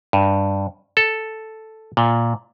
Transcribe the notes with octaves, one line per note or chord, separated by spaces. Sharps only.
G2
A4
A#2